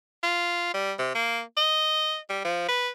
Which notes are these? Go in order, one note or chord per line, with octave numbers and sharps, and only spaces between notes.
F4
G3
C3
A#3
D#5
G3
F3
B4